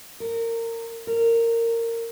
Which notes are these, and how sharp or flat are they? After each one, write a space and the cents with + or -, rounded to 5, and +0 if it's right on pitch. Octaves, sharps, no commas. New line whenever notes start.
A#4 -25
A#4 -20